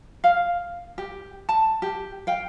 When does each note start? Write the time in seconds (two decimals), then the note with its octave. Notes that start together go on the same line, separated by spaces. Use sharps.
0.24 F5
0.98 G4
1.49 A5
1.82 G4
2.27 F5 G5